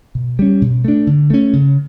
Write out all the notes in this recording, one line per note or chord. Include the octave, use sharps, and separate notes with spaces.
B2
G3 C#4
B2
A3 D4
D3
A3 C#4
C#3